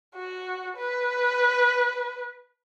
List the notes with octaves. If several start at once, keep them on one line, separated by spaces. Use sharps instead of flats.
F#4
B4